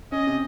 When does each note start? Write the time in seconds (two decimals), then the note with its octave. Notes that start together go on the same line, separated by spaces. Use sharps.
0.12 C#4 D#5
0.27 C3